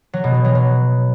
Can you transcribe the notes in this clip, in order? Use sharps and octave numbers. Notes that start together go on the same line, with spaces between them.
F#3
B2
F#3
F#3
F#3